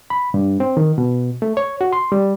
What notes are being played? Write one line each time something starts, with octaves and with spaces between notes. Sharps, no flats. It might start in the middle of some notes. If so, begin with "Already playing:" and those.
B5
G2
C4
D#3
B2
A3
C#5
F#4
C6
G3